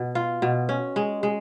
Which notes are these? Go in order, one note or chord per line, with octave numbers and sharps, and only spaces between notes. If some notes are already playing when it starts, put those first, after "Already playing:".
Already playing: B2
F4
B2
C#4
G#3
G#3